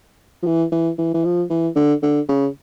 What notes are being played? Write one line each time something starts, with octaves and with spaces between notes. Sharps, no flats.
F3
E3
E3
E3
E3
F3
E3
D3
D3
C#3